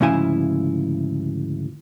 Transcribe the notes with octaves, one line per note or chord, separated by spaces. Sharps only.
D2 G#2 C#3 F3 E4 G#5